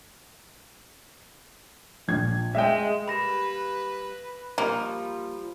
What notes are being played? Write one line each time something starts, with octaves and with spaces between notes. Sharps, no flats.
A#1 G#6
G#3 E5 G5
G3 A#3 B4 B5 A#6 E7
F3 G3 A#3 F4